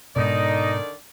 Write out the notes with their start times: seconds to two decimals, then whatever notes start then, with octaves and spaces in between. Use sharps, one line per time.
0.16 G#2 B2 D3 D#3 D#4 D5